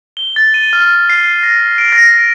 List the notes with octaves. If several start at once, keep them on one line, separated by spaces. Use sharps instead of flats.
G7
A6
D#7
F6
C7
A#6
D7
A#6
A#6